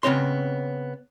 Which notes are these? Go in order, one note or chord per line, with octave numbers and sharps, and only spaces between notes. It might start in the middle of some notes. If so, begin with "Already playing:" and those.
C#3 B3 C4 C#5 C6